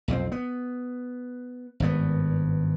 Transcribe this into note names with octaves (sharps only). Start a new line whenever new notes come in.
B1 F2 G3 C4
B3
G#1 G2 B3